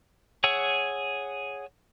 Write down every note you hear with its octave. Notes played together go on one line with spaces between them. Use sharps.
G#4 C#5 F#5 E6